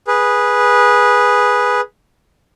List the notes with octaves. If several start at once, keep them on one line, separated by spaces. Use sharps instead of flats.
G#4 B4